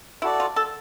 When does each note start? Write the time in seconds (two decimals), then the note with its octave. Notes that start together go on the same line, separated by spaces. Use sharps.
0.22 E4 F#4 A4 D5
0.40 F4
0.56 A4